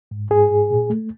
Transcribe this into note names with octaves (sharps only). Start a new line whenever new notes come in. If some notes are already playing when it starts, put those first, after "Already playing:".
G#2
G#2 G#4
G#2
A#2
A3